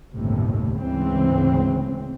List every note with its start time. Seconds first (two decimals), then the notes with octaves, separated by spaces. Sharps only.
0.14 G1 D#2 A2 C3
0.79 D2 G#2 C#3 E3 C4